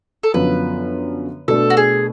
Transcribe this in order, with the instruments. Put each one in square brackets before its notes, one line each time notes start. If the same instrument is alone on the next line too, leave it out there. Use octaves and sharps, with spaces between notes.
[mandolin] A4
[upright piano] F#2 D3 F3 B3 [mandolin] B4
[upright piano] B2 A3 D4 [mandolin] A4
[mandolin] F#4
G#4